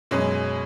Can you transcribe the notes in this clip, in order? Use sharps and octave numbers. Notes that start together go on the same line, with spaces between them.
F#2 B2 G#3 C#4 G#4